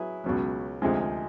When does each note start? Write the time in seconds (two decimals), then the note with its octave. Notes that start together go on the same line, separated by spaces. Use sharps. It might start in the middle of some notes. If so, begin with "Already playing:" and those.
Already playing: F#3 B3 E4 G#4
0.24 C#2 B2 F#3
0.82 D2 C3 F3 G#3